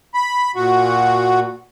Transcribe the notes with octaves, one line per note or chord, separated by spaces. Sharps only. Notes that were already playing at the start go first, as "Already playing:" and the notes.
B5
A#2 F#4